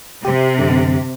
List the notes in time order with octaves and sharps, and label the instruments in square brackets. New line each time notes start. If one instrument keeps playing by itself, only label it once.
[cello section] C3 [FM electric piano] G4
[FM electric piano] F#2 D3